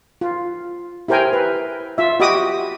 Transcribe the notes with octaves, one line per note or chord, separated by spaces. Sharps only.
F4
E4 G4 A#4 C5 G5 G#5
B4
F4 E5
F#4 G4 D#5 B5 D6 D#6